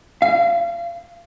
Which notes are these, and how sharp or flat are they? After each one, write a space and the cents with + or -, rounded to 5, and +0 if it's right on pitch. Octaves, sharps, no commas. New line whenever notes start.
F5 -30